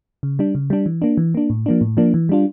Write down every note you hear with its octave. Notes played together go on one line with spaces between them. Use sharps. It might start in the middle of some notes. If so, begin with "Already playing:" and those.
C#3
G3 D4
C#3
G3 D4
E3
A#3 D4
E3
A#3 D4
A2
F3 A#3 D4
A2
F3 A#3 D4
E3
G3 D4 F4